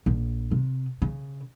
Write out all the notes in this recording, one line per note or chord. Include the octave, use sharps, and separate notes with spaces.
A#1
C3
C#3